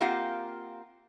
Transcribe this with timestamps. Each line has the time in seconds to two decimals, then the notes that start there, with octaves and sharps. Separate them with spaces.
0.01 A#3 C4 F4 G4 F5 F#5